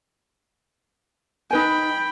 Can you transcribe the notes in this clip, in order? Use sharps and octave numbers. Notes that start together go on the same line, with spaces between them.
D#4 B4 G5 G#5 B5